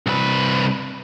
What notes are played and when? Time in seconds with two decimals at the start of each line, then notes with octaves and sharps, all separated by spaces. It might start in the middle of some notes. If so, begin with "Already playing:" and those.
0.07 C2 B4